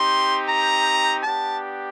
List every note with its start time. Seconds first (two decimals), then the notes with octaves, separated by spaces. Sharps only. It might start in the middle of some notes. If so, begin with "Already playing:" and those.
Already playing: C4 D#4 G4 C6
0.48 A#5
1.24 B3 D4 G4 A5